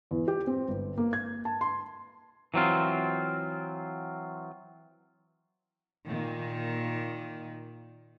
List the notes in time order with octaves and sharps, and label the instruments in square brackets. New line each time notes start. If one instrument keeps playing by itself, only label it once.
[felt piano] E2
G4
C4
G1
A#3
G#6
A5
C6
[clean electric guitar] E3 F#3 C4 F4
[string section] A#2 D#3